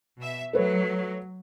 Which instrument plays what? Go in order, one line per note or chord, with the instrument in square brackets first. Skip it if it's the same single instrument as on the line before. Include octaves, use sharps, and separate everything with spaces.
[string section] B2 E5
[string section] F#3 [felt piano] A3 B4 C#5